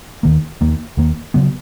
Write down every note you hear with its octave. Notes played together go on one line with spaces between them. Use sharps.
D#2 D#3 A#3
D#2 D#3 A#3
D#2 D#3 A#3
C#3 F#3 B3